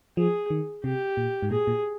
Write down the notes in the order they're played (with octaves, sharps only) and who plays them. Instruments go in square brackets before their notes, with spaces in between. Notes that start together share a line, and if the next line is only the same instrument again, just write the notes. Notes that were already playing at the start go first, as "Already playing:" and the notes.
[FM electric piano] F3 [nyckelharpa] G#4
[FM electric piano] D#3
[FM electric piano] C3 [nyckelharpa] G4
[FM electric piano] A#2
G#2
[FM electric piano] A#2 [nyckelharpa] G#4
[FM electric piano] A#2